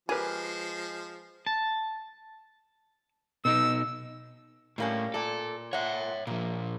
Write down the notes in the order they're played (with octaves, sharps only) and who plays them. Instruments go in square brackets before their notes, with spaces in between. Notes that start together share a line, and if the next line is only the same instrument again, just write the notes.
[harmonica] F3 G#3 [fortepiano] G4 A#4 B4 [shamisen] G#4
[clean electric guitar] A5
[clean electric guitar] B2 D#4 [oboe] E6
[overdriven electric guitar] A2 [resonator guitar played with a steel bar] G3 A#3 C#4
[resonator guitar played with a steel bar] A#2 D5 [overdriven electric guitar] A4
[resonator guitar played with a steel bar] A#2 F#5 [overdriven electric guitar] C#5 E5
[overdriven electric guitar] A#2 F3 [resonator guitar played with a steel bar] A#3